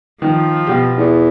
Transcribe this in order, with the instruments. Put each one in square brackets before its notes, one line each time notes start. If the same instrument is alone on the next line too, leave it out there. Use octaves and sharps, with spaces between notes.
[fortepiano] D#3 [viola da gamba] F3
[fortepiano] B2 G4
[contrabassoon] E2